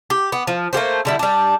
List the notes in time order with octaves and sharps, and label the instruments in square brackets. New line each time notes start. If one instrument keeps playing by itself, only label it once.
[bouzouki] G4
B3
F3
A3 A#3 G4 C5
D3 G3 E4
G3 D4